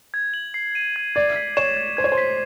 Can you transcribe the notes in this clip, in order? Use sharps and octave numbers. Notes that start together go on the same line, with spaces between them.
G#6
F#7
C7
D#7
G#6
D5 G#6
B6
C#5 E7
G#6
C5 G#6
C#5
C5
B6